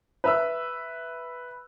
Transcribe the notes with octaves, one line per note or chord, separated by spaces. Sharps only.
B4 E5 E6